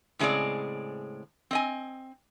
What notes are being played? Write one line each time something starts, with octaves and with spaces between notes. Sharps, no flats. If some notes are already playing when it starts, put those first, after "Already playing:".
A2 C#3 G#3 C4 G#4 D5
C4 D#5 G#5